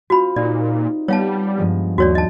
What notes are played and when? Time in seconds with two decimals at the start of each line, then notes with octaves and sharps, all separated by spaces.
0.10 C4 F4 F#4 B5
0.36 A#2 D#4 G4 D5
1.08 G3 B3 C#5 F5 A5
1.57 G2 F3 G#3
1.98 D#2 F#4 C#5 D5
2.15 D#5 A5